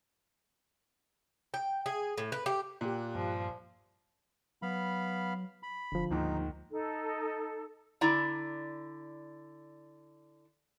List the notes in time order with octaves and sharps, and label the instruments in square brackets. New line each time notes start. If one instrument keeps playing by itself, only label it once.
[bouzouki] G5
G#4
A2
B4
G4
[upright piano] A#2 [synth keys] G4 G5 F#6
[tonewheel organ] G2 [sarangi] F3
[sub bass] F#3 [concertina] B3 F5 B5
[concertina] B5
[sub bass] F1 [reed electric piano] D3 F3
[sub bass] D2 [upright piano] G#2 D#3 A#3 [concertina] D#4
[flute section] D#4 A4
[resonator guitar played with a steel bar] D3 E4 D5 A#5